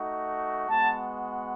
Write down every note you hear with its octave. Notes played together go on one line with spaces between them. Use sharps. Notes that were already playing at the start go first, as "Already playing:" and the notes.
Already playing: A3 D#4 F#4
G#3 B3 F#4 A5